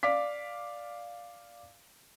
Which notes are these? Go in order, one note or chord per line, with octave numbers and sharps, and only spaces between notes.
D5 F5 D6 B6